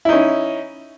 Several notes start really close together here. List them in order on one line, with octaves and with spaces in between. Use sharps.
E4 D#4 C#4